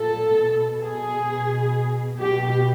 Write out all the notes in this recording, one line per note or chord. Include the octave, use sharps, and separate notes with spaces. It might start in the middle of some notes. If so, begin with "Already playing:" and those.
Already playing: A#2 A4
B2
G#4
B2
B2 G4